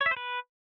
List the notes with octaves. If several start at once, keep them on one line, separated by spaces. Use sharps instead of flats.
C#5
E5
C5
B4